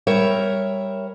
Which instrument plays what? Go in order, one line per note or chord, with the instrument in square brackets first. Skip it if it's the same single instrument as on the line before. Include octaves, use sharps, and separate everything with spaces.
[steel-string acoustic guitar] G3 A#4 C#5 E5